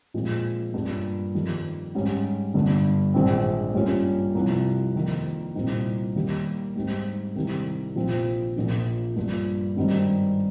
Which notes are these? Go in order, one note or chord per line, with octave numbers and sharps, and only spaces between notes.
A#2 F3 G#3 C4
G2 G3 A#3 F4
F2 D#3 G3
G#2 G3 C#4
G1 G2 G3
A#1 G#2 D#3 G#3 C4
G2 G3 A#3 C#4 F4
C2 C3 F3
F2 D#3 A#3
C2 A#2 G3 C4 D#4
D#2 D#3 G3 A#3
G#2 G3 C4 D#4
C2 C3 D#3 G3 C4
A#1 A#2 F3 C4
A#1 A#2 F3 A#3
G2 F3 A#3 F4
G#1 G2 G3 C4 D#4